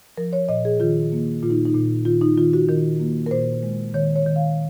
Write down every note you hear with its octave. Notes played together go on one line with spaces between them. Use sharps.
F3 A#4
C#5
A#2 D#5
G#4
D#3 F4
A#3
A#2 F4
D#4
D#4
A#2
D#3 F4
D#4
D#3 F4
F#4
D#3 A#4
A#3
A#4
A#2 C5
G#3
D#3 C#5
C#5
D#3
F5